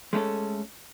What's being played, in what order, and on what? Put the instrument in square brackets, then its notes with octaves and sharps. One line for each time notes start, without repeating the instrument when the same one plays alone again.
[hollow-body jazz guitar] G#3 A3 C#4 A4